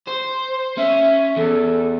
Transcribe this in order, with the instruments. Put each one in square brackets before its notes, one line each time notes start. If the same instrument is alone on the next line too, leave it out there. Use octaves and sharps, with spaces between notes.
[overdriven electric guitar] C5
[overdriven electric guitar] C#4 [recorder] E5
[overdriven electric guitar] E2 [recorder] A4